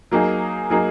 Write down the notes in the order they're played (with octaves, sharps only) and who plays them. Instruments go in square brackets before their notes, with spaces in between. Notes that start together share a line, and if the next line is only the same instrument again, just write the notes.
[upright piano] F#3 A#3 D#4 G#4
F#3 A#3 D#4 G#4